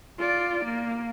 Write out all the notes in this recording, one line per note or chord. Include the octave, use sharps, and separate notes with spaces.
F4 D5
A#3